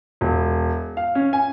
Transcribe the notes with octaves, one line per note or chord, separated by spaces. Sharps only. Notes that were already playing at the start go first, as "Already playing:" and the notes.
E1
F5
C#4
G#5